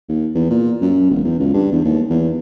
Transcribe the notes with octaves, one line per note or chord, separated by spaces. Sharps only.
D#2
E2
A#2
F#2
E1
E2
C#2
G2
E2
D#2
E2